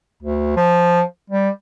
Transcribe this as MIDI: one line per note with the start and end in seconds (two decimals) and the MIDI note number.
0.23 0.53 38
0.57 1.01 53
1.30 1.50 55